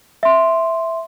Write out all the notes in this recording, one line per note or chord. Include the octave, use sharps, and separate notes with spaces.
E5 C6